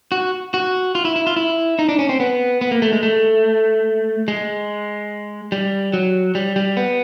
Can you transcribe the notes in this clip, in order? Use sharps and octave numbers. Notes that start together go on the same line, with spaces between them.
F#4
F#4
F4
E4
E4
F4
E4
D#4
D4
C#4
C4
B3
B3
A#3
A3
G#3
A3
G#3
G3
F#3
G3
G3
B3